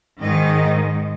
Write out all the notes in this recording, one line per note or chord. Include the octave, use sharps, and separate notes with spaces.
G#2 D#3 G#3 D#5